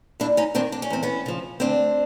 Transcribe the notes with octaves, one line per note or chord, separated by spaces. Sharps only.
D#2 D4 E4
C#4 D#4
D#3 C4 D4
D4
C#4
E2 C4
B3 C#4
C#3 F3
D2 C4 D4